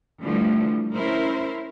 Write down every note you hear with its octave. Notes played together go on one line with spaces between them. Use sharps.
D3 E3 F3 G3 A3
C#4 E4 A#4 C5